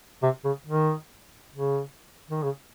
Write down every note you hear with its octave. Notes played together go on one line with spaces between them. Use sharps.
C3
C#3
D#3
C#3
D#3
C#3